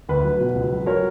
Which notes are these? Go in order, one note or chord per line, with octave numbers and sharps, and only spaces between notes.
D2 B4
F#3
B2
C#2
F#3
F#3 A#4 C#5